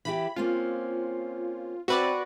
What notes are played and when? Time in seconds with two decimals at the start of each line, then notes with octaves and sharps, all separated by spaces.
0.05 E3 E4 G4 B5
0.36 A#3 C4 C#4 F4
1.88 C4 F#4 B4 D5 E5